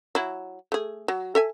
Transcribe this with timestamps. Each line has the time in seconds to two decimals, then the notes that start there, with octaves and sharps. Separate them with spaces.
0.15 F#3 E4
0.72 A3 G#4
1.08 F#3
1.35 A4 E5 G#5